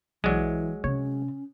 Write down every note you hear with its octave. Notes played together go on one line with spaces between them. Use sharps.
B1 E3 F#3 G#3 D5
C3 C#4 C#5